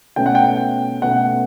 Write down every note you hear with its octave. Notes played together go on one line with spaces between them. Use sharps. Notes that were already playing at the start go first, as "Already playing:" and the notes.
B2 A3 C#4 G5
F#5
G5
B2 A3 C#4 F#5